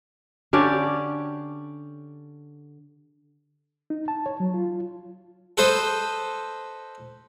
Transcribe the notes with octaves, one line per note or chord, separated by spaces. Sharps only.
D3 C#4 G4 D5
D#4
A5
C#5
F#3
F4
A4 B4 C5 D#5